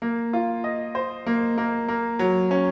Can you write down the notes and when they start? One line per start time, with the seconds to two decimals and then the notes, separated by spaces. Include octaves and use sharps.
0.02 A#3
0.33 F4
0.64 D#5
0.95 C5
1.26 A#3
1.58 A#3
1.88 A#3
2.19 F#3
2.51 C#4